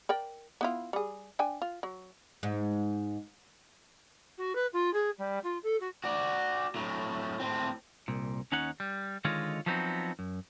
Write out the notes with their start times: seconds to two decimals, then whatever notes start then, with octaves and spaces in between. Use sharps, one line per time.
0.09 A#4 D5 G5
0.61 B3 E4 F4
0.93 G3 G#4
1.39 D4 G5 G#5
1.62 F4
1.83 F#3
2.43 G#2
4.38 F#4
4.55 B4
4.73 F4
4.93 G#4
5.18 G3
5.43 F4
5.63 A4
5.80 F#4
6.04 F#4 D5
6.75 A2 F#3
7.40 A2 C4
8.08 C2 A#2
8.52 D#2 C#4 D#4 C#5 F#5
8.80 G3
9.25 D3 D#3 G#3 F4 C#5 D#5
9.66 F3 F#3 B3 C4 D#4
10.19 F#2